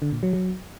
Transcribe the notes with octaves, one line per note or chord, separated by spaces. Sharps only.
D3
A#2
F#3
F#3